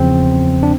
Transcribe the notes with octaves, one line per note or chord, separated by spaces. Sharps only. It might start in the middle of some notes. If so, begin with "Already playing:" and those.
Already playing: E2 C#3 F3 C4
D4